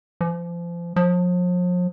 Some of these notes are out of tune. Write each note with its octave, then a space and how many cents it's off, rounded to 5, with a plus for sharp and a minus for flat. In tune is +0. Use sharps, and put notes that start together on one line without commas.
F3 -30
F3 +40